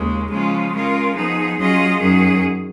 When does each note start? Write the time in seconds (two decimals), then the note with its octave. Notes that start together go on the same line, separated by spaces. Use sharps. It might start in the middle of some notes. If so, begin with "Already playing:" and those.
Already playing: D#2 C#3 G#3
0.31 C#3 F3 G#3 C#4 F4
0.73 G#3 C#4 F4 A#4
1.15 F3 B3 D#4 G#4
1.58 F#3 C#4 F4 G#4 D#5
2.00 F#2 D#3 F#3 C#4 G#4